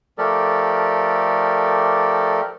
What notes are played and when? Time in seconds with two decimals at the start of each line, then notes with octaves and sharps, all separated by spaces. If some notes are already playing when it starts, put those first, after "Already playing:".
0.18 F3 A3 G4 A4 A#4 D5